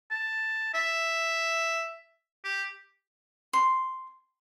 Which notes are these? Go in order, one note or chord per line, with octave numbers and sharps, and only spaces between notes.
A5
E5
G4
C6